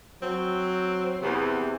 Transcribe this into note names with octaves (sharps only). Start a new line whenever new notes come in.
F#3 C4
E2 C3